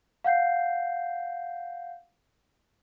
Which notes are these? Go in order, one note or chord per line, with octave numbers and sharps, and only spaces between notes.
F5 F#5 G6 C7